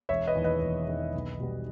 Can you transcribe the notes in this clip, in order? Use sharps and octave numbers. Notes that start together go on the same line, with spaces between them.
E1 C#5 E5
B4 D#5
E2 D#3
B4 D#5
E1
E2 D#3
B1
B2 G3 B3